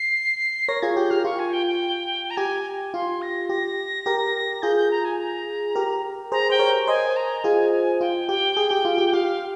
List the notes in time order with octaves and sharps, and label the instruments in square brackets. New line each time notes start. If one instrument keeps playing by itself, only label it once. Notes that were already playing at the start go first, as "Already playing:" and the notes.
Already playing: [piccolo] C7
[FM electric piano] A#4 C#5 [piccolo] A#6
[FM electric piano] F4 G#4 [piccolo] G#6
[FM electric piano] G4 [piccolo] G6
[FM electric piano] G4 [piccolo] F6
[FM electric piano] F4 [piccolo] C#6
[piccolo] G#5
G5
G5
A#5
[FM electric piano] G4 [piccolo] G#5
[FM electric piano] F4 [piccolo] C6
[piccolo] A#6
[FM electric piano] G4 [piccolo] A#6
[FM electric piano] G4 A#4
[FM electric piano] F4 G#4 [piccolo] G6
[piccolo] G6
A#5
G#5
A#5
[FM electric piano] G4 A#4
[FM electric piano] G#4 C5 [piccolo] A#5
[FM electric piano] C5 [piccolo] G5
[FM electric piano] A#4 C#5
[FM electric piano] C5 D#5 [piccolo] G#5
[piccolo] A#5
[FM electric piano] F4 G#4 [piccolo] G#5
[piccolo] G#5
[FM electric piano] F4 [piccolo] G5
[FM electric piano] G4 [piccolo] G5
[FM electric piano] G#4
G4
F4
G4
[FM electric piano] G4 [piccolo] F5